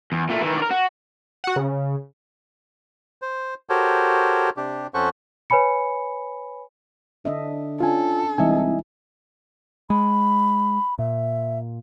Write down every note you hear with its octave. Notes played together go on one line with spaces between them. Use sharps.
E2
A#2 A3
D#3 E3
A#4 D5
F#4
F#4 F#5
C#3
C5
F#4 G4 A4 A#4 C5 C#5
C3 D4 G4
F2 C#4 A4 C5 F#5 C#6
B4 C#5 G#5 B5 C#7
D3 D4 D#5 E5
C#4 D4 F4 A4 G#5
C2 E3 G#3 D#4 D#5 E5 G#5
G#3 B5
A#2 E5